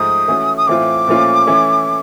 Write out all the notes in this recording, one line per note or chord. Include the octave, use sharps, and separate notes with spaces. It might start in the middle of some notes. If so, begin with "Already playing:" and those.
Already playing: G#2 F3 A3 D#6
E3 A3 C#4 F#4
D#6
A2 E3 A3 C4 F4 D6
A#2 F3 A3 C#4 F4
E3 A3 C#4 E4